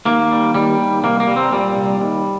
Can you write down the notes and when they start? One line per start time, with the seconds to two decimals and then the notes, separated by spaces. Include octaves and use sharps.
0.06 D#2 A#3
0.31 G3
0.54 D#2 G3
0.80 D#2
1.04 C2 A#3
1.20 A#3
1.27 G3
1.36 C4
1.52 A#2 G3
1.77 C2
2.00 D#2